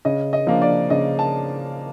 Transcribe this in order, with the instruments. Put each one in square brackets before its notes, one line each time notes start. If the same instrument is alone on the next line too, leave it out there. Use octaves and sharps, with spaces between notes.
[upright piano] C#3 D#5
D#5
F3 A#3 D4
D5
C#3 D#5
A5